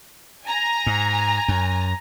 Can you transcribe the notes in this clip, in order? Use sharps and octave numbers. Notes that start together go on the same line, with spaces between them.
G#5 A#5
G#2
F#2